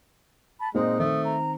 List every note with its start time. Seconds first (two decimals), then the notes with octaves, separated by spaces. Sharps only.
0.60 A5 B5
0.74 A#2 G#3 C4 D#4
1.00 D#3 A3 C4 D#6
1.24 A#5